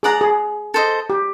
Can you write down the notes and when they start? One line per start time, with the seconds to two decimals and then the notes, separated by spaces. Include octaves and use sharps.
0.03 G#4 D5 F#5 A#5
0.21 G#4
0.74 A4 C5 D#5
1.10 G4